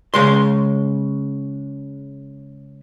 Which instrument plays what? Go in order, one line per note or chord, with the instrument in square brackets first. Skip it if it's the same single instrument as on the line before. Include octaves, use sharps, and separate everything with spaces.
[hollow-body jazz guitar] C#3 G#3 C6